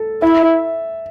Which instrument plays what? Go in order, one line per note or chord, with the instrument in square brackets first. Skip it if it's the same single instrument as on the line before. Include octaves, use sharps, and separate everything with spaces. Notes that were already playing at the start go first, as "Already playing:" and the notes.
Already playing: [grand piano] A4
[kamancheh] E4 [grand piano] E5